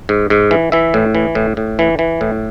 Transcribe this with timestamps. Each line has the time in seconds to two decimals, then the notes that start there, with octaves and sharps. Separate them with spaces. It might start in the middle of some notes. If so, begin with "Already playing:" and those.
0.09 G#2
0.30 G#2
0.51 E3
0.72 E3 E5
0.94 A2
1.15 E3
1.35 A2
1.57 A2
1.79 E3
1.99 E3
2.21 A2